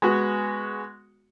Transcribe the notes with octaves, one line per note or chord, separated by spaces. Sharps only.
G#3 B3 F#4